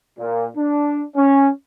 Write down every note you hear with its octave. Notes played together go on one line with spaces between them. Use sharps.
A#2
D4
C#4